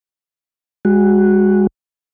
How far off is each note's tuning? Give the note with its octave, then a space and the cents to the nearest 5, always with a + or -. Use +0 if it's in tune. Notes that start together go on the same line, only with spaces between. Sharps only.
G#3 -25 F#4 +0